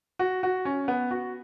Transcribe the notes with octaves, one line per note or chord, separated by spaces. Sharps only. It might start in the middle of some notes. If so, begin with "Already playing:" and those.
F#4
F#4
C#4
B3
F#4